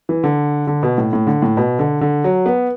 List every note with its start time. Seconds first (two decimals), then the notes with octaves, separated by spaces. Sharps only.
0.09 E3
0.24 D3
0.67 D3
0.83 B2
0.98 A2
1.13 A2
1.27 D3
1.42 A2
1.57 B2
1.79 D3
2.01 D3
2.24 F#3
2.46 B3